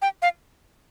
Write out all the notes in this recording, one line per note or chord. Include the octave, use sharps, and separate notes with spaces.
G5
F5